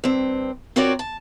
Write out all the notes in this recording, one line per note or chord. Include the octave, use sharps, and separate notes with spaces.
G2 C4
C4 F4 F#4 A#4 C#5 D5
A5